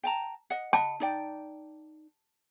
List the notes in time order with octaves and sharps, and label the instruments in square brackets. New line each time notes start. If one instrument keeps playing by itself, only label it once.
[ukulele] G5 A5 A#5
D#5 F#5
[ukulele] D#5 F#5 B5 [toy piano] A5
[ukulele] D#4 D5 G5